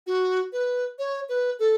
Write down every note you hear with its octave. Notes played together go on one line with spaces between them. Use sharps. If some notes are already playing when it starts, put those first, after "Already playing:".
F#4
B4
C#5
B4
A4